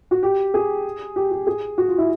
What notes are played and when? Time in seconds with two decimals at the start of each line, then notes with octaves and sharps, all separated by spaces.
0.11 F#4
0.23 G4
0.54 G#4
1.16 G4
1.31 G4
1.47 G#4
1.78 F#4
1.88 F4
1.98 E4